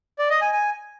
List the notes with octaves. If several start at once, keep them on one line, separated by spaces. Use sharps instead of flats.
D5
D#5
G#5
G#5